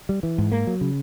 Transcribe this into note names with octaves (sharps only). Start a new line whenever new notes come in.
G3
E3
G#2
A#3
F#3
C#3